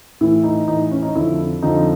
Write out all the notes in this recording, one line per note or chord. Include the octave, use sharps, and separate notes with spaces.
A2 E3 E4
D#4
A2 E3 D#4
C#4
D#4
F2 D3 F3 E4
F2 D3 F3 D#4